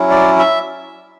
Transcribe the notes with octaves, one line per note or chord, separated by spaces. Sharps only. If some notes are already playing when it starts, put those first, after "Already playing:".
Already playing: F#3 C#4 E4
D5
E5